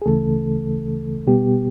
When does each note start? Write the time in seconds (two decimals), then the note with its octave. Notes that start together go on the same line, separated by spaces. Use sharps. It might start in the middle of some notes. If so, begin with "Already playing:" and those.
0.02 G#4
0.06 D2 C#3 E3 A3 A4
1.27 B2 G3 B3 G4